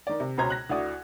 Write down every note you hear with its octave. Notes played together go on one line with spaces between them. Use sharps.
D#3 D5
C3
C#2 B2 C#4 C5 A#5 G#6
F#6 A#6
D2 E4 F#4 D5 D#6